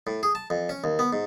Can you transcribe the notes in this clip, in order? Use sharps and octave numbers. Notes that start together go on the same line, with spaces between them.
A2
G#4
A5
F2
C#4
D#2
B3
G#2